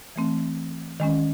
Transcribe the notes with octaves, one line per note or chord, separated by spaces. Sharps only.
E3 A3 C4
D#3 G#3 C#4